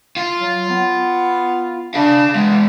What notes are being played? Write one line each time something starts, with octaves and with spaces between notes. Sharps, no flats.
F4
F#3
B3
D4 G#4 F5
E2 G#3 B3